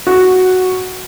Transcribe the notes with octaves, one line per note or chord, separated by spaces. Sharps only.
F#4